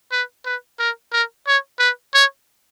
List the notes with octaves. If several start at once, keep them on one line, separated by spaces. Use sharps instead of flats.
B4
B4
A#4
A#4
C#5
B4
C#5